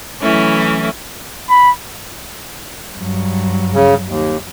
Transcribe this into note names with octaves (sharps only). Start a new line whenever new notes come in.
E3 F#3 A3 C#4 E4
B5
G2 F#3
C#3
D#2